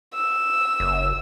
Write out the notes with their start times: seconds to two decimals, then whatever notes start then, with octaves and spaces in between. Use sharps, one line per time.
0.14 E6
0.80 F#1